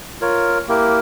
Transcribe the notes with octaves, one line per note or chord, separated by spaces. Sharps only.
F4 A#4 C#5
A#3 E4 G4 A#4